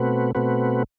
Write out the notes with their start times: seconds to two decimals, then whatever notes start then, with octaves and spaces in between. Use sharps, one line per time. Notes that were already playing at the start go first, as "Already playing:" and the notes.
Already playing: B2 A3 C4 F#4 B4
0.35 B2 A3 C4 F#4 B4